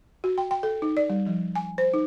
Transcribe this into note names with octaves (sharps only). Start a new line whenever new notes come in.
F#4
G5
G5
A4
D#4
D5
G3
F3
G#5
C5
D#4